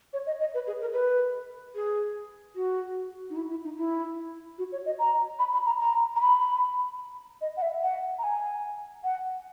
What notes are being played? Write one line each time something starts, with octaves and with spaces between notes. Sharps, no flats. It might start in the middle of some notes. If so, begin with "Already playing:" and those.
C#5
D#5
D#5
B4
G#4
A#4
B4
G#4
F#4
D#4
E4
E4
D#4
E4
F#4
C#5
D#5
A#5
B5
B5
A#5
A#5
A#5
B5
D#5
F#5
E5
F#5
A#5
G#5
F#5